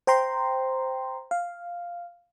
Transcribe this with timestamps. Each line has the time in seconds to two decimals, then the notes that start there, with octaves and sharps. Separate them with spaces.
0.07 C5 G5 A#5 C6
1.31 F5